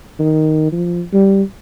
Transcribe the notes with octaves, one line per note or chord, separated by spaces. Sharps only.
D#3
F3
G3